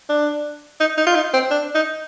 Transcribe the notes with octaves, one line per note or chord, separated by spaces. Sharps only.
D4
D#4
D#4
F4
D#4
C4
D4
D#4